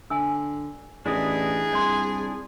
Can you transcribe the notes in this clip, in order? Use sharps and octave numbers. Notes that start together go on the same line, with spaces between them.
D3 G#5 E6
A1 D4 E4 G#4 D#5
C2 D5 C6